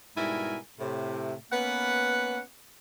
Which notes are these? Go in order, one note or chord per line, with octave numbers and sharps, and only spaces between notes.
G#2 B2 G3 E4 A#4 G#5
A2 C3
A#3 B3 C#4 B4 F#5